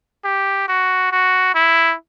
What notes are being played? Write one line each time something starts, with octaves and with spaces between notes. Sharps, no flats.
G4
F#4
F#4
E4